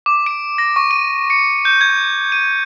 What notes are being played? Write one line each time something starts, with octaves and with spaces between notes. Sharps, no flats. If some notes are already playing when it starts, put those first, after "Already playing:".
D6
D7
A#6
C#6
D#7
C#7
G6
G#6
D#7